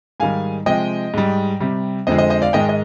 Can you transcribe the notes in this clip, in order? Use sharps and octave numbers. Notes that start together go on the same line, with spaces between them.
G#2 D#3 G3 F5 G#5
C3 F3 G#3 D#5 G5
G#2 G3
C3 G3
F2 D3 F3 G#3 C5 D#5
C5 D#5
C5 D#5
D5 F5
G#2 D#3 G#3 D#5 G5
D#5